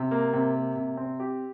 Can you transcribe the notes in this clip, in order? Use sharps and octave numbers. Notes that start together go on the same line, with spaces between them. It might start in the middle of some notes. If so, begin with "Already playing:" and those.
Already playing: C3
A#3
C3
A#3
C3
C4
G4